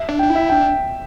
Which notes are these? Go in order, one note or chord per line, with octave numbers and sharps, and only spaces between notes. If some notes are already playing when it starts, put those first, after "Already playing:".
Already playing: E5
D4
D4 G5
E4
E5
D4 G5